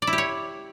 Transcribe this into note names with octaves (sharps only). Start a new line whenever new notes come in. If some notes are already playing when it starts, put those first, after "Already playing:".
D5
E4
G4
C#5